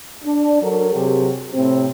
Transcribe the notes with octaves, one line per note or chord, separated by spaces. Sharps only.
D4
F#3 A4 A#4
C3 F#3 G4 G#4
A2 C3 C4